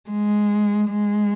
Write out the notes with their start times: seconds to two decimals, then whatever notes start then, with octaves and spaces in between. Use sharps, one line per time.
0.10 G#3
0.89 G#3